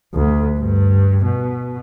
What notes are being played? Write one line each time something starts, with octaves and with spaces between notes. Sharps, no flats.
D2
G2
B2